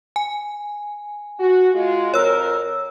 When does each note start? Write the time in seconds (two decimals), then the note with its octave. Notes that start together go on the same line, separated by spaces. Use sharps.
0.16 G#5
1.39 F#4
1.74 G#3 F4 F#4
2.14 F2 A#4 C#5 E6